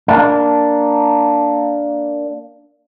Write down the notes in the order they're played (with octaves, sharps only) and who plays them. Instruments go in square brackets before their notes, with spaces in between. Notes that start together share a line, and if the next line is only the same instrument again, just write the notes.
[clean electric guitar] A#3 D4